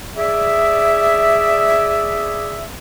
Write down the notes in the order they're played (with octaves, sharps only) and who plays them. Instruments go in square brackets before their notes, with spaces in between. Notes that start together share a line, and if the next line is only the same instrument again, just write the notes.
[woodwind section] G#4 D5 E5